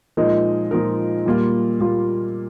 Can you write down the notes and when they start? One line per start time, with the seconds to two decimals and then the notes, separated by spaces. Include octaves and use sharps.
0.17 A#2 F3 G#3 D#4 A#4
0.71 A#2 F3 G#3 D#4 A#4
1.26 A#2 G3 A#3 F4
1.80 A#2 G3 A#3 F4